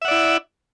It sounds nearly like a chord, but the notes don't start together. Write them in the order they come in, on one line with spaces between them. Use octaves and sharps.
E5 F#5 D5 E4